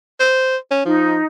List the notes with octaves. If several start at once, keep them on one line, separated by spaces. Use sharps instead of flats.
C5
C#4
F3 D#4